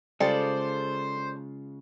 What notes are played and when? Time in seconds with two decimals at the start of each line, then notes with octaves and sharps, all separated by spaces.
0.20 C#3 G3 G#3 F4 A4 C5 D5